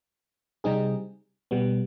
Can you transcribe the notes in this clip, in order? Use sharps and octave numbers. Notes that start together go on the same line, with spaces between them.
C3 G3 C4 D#4 G#4
B2 G3 B3